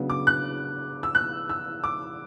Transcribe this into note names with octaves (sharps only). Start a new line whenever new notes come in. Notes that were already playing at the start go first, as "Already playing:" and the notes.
Already playing: C#3 F#3 B3 D4
D6
F#6
E6
F#6
E6
D6